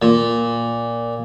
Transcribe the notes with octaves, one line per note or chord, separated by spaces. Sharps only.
A#2